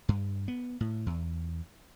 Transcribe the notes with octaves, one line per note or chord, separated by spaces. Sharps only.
G2
B3
A2
E2